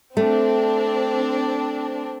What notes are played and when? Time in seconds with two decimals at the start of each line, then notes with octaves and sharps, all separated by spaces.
0.17 A3 C4 D4